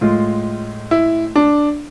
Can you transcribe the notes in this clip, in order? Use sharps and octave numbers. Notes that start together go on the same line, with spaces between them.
A2 G#3 F4
E4
D4